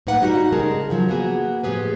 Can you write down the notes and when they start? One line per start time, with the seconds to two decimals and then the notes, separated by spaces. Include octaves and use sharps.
0.07 A2 A#3 D#4 B4 F#5
0.22 G3 D#4 F#4
0.52 C#3 G#3 G#4 A#4 A5
0.90 C#3 F3 F#3
1.09 A#3 B3 F#4 G#4
1.63 A2 F3 G4 G#4 B4